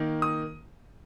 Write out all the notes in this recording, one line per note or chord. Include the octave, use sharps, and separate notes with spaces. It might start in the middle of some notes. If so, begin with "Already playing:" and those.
Already playing: D#3 A#3
D#6